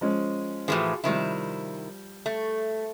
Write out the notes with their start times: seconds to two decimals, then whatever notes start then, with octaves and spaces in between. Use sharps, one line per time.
0.01 F3 G#3 C#4
0.68 A2 E3 F3 F4 F#4 G#4
1.04 C3 D#3 F3 G3 E4
2.26 A3